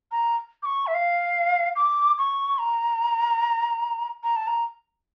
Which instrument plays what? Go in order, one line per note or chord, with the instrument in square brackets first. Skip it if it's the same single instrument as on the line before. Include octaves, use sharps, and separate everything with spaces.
[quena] A#5
D6
C#6
E5
F5
D6
C#6
A#5
A#5
A5
A#5